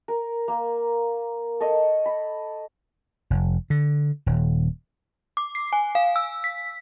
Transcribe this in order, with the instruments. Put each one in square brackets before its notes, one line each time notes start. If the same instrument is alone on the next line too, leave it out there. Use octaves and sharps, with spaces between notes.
[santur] A#4
A#3
A4 C#5 D#5
B5
[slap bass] F1
D3
D#1
[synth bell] D6
C7
G#5
F5
E6
B6